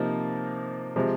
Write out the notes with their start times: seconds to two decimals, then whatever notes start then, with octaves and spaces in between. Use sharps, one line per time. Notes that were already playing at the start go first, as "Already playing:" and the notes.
Already playing: C3 F3 A#3 D#4
0.96 C3 F3 G#3